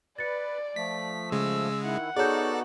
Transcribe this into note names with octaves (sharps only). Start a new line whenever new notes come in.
B4 D5 A6 C#7
F3 A3 B6
C#3 G#3 E6
D#3 E4 F#5
B3 D#4 F#4 G#4 A4 C#5 D5 G6